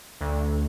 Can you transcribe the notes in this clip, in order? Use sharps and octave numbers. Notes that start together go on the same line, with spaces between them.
D2